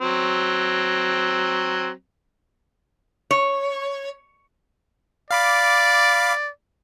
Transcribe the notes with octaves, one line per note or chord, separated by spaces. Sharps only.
F#3 C4
C#5
D5 F5 B5 D6